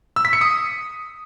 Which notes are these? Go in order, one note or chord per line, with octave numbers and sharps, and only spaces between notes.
E6
B6
C#7
D#6